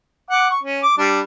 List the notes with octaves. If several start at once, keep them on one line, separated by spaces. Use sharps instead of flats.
F#5 D6
C#6
C#4
D6
G3 D4